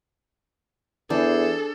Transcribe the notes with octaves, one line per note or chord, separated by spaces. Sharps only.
E2 D4 G#4 A4 C5